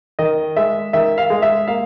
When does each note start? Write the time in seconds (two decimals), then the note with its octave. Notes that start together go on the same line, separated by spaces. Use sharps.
0.19 D#3 D#5
0.56 G#3 E5
0.93 D#3 E5
1.18 F5
1.30 G#3
1.42 E5
1.68 A#3 F5